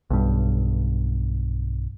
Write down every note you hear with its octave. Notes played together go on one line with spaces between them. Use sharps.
B1 G2